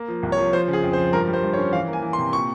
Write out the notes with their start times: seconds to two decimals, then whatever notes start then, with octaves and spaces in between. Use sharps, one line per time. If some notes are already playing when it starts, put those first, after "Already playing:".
Already playing: A#3
0.08 F3
0.23 C2
0.32 C#5
0.38 F3
0.53 F3 C5
0.68 C#3
0.73 G#4
0.83 F2
0.93 C5
0.98 F3
1.13 G2 A#4
1.28 G3
1.33 C5
1.43 G2
1.53 C#5
1.58 C#4
1.72 E3 F5
1.88 A#3
1.93 G#5
2.02 E3
2.13 C6
2.18 C3
2.33 A#2 C#6